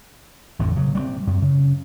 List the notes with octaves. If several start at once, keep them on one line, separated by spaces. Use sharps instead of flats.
A1 F2 A2 D3
C#3 F#3
G3 G#3 C4
F#2
C#3